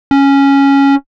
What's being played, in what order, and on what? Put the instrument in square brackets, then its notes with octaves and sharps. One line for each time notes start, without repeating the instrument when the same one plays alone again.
[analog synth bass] C#4